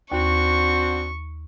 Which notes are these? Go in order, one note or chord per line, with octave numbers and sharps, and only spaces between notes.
D#2 C4 D4 F#4 C#6